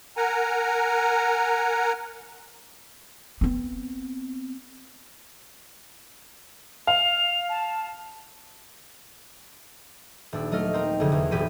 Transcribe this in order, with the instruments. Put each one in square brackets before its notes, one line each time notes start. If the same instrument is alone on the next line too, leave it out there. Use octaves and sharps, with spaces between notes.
[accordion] A#4 F#5 G#5 A#5
[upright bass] B3 C4
[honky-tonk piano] F5 [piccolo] F7
[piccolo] A5
[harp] D#1 D4 E6
F#3 A3 D#5 F6
C4 D#4 A#4
F1 D3 G#4
E2
D#1 B2 G4 G#4 B6 D#7